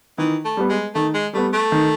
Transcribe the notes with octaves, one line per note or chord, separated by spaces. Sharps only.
D#3 E3
A3
G3 B3
G#3
D#3 A3
G#3
G3 A3 B3
A3
D#3